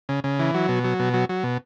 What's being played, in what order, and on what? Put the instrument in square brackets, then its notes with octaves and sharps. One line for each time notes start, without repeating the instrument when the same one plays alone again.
[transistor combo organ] C#3
C#3
E3
F#3
B2
F#3
B2
F#3
F#3
B2